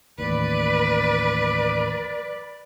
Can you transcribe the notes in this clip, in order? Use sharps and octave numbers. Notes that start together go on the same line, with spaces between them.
A1 D#2 B4 D5